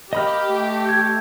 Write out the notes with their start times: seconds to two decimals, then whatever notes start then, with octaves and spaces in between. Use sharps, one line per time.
0.13 A#3 G4 D#5 B5 F6
0.50 A3
0.86 G6 G#6